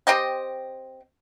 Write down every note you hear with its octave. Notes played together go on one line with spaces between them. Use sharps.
C4 G4 D#5 G5